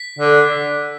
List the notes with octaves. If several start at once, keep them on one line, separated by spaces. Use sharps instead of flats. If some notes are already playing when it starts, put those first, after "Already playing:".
Already playing: B6
D3